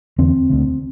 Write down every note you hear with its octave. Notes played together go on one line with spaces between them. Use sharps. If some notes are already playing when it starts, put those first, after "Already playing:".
E2 D3 C4
D2 D3